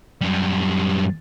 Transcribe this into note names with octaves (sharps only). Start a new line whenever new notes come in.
F#2 G3